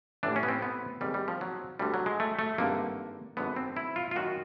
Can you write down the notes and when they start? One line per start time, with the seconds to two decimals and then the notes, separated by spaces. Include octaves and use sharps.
0.23 A1 A2 E3 D4
0.36 C#4
0.43 B3
0.48 C4
0.62 B3
1.01 G#1 G#2 D#3 G3
1.14 G3
1.28 F3
1.41 F#3
1.79 D2 D3 G3
1.94 F#3
2.06 G#3
2.20 A3
2.39 A3
2.58 G#1 G2 D3 A#3
3.37 G#1 F#2 D3 B3
3.56 C4
3.77 E4
3.96 F4
4.11 F4
4.16 F#2 D#3 F#4